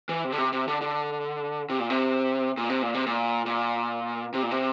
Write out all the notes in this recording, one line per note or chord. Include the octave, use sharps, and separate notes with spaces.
E3
C3
D3
C3
C3
D3
D3
C3
A#2
C3
A#2
C3
A#2
C3
A#2
A#2
C3
A#2
C3